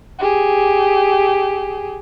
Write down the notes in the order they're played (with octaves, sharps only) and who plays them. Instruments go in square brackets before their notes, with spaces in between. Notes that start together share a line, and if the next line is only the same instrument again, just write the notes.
[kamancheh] G4 G#4